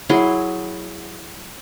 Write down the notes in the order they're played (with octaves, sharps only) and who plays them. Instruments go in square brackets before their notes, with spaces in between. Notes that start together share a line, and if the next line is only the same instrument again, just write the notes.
[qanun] F#3 E4 G#4 C6